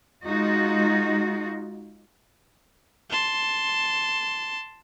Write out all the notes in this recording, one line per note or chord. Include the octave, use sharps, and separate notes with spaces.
G#3 D#4 F4 F#4
A5 C6